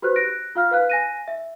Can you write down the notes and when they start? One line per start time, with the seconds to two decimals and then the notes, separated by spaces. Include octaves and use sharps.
0.02 F#4 G4 B4 C5 F#6
0.16 F#6 A#6 D7
0.55 F4 F5 F6
0.71 B4 F5 F#6
0.90 G#5 A#6 D#7
1.28 E5